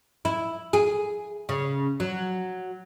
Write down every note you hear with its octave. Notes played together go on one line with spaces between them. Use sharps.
E4
G#4
C#3
F#3